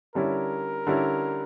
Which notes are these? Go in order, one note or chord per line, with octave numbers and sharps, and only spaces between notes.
D3 G3 C#4 E4 A#4
D3 G3 C#4 E4